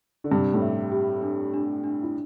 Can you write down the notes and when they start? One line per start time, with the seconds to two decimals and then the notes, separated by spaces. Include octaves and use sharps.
0.24 D3
0.31 G2 C3 G4
0.54 A2
0.62 E5
0.92 G4
1.22 D4
1.54 D4
1.84 D4
2.03 E4